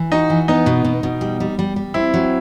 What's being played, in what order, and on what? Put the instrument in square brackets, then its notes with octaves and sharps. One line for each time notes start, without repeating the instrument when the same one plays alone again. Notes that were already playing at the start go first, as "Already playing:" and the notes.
Already playing: [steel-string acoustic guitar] E3
[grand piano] D#4 [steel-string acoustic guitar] F#4
[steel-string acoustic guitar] E3
[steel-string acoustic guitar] B3 [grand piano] D#4
[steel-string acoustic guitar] B2
B2
B2
G3
G3
G3
G3
[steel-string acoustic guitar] C4 [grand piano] E4
[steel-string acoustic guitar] F#3